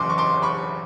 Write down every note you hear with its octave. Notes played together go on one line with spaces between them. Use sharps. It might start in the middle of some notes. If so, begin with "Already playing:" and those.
Already playing: F#1 E2 C#3 E3 C6 D6
C#6
C6 D6
B5 C#6